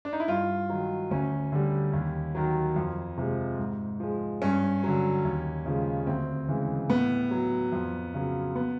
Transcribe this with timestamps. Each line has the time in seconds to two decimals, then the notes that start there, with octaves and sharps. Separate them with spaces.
0.05 D4
0.13 D#4
0.20 E4
0.28 G2 F4
0.70 D#3 F#3
1.11 D2 C#4
1.52 D3 G3
1.93 D#2
2.35 D#3 F#3
2.76 F2
3.18 C3 F3 G#3
3.59 G#2
4.00 F3 G#3
4.42 G2 C#4
4.84 D3 F#3
5.25 D#2
5.66 C#3 F3 G#3
6.07 D2 C4
6.49 C#3 E3 G#3
6.89 A2 B3
7.31 F#3
7.72 F2
8.14 C#3 F#3
8.55 B3